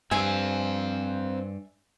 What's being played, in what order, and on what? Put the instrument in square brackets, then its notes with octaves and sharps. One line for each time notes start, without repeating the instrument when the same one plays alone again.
[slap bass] G2 [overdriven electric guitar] C4 F5 [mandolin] E5 G#5